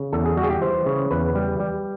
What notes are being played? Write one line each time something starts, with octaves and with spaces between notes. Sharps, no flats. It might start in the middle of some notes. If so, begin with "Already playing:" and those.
Already playing: C#3
E2 A4
G#4
G3 F#4
G#4
G4
E3 C5
C#3
E2 B4
G3
G3